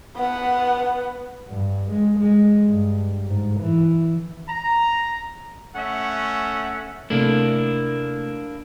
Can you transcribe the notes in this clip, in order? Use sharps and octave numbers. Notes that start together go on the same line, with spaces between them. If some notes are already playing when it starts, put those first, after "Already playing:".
B3 F#5
G2
G#3
G#3
G2
G#2
E3
A#5
A3 C#4 E5 F#5
C3 A3 A#3 D4 E4